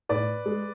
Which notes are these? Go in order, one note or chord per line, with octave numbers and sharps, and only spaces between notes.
A2 B4 D5
G#3